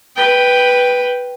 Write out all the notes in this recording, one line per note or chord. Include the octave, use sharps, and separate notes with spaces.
B4 G5